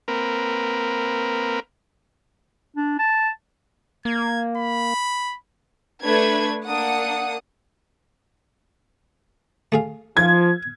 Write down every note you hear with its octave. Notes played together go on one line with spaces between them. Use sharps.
A#3 C4 A#4 B4
D4
A5
A#3 G#6
B5
A3 D4 B4 G#6
A#3 D4 F#5 D#6
A3 G#4 F5
F3 G#6